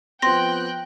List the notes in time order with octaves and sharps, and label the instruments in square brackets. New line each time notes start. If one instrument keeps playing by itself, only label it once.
[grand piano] F3 B3 C4 [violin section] G5 F#6 [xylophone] C6 A#6